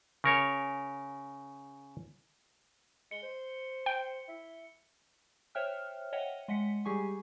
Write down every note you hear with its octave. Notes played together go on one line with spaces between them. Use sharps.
C#3 A#4 C#5
G#3 C#7 G7
C5
G5
E4
C5 C#5 E5 G5 F6 F#6
C#5 D#5 E5 F#5 G5
G#3 D#5 F#5 B6 C#7
G3 G4 G#4 G#5 C#6